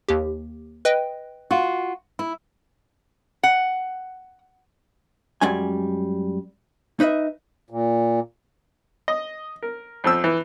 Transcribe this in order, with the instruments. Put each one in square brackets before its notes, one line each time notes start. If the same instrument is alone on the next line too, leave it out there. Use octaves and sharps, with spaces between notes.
[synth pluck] D#2 G4
B4 D#5 G5
[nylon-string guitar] F4 F#4
E4
[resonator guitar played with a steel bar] F#5
[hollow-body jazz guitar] F#2 G3 G#3 C#4 G#5
D#4 B4 D#5 E5
[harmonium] A#2
[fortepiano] D#5
A#4
F2 F3 E6
E3